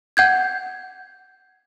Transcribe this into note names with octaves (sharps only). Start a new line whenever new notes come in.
F#5 G6 G#6